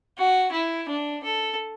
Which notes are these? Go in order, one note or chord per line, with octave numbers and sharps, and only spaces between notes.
F#4
E4
D4
A4